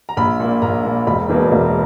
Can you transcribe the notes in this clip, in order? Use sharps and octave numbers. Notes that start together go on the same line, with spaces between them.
A#5
A#1 B5
A#2 A#3
A#1 A#5
A#2 A#3
E1 B5
E2 B2 A#3
E1